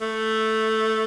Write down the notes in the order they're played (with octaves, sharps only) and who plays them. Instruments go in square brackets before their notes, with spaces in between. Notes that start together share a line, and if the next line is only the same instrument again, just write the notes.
[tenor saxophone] A3